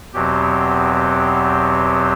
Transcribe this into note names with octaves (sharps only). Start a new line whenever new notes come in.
E2 B2 F#3 C4 G4
G4